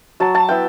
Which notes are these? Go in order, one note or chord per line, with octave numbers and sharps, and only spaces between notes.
F#3 A5
A5
B3 E4 G5